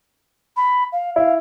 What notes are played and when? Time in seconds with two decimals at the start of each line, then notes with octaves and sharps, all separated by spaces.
0.56 B5
0.92 F5
1.16 E4 F5